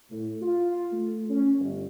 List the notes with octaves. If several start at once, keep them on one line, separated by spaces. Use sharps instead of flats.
A2
F4
A3
C#4
G1